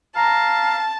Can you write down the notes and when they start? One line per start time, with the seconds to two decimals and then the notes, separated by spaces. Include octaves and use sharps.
0.16 F5 A5 A#5 A#6